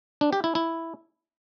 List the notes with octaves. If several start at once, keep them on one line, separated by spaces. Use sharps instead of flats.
D4
G4
E4
E4